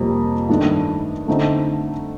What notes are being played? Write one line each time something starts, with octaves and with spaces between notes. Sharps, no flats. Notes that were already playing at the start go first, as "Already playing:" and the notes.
Already playing: F2 C3 G3 A#3
G2 D#3 A3 D4
D3 A3 C4 D#4